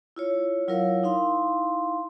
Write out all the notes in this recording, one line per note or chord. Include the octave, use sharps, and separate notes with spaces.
E4 F4 C#5
F#3 E4 F4 A#4 C#5 F5
D#4 E4 F5 C6